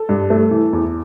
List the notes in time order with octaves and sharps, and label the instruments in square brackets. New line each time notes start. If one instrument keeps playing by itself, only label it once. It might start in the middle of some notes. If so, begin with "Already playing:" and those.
Already playing: [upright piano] A4
G2
A3
E3
E2